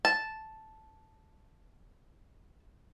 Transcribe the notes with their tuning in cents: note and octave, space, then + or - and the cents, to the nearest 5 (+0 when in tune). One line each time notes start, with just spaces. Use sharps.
A5 -5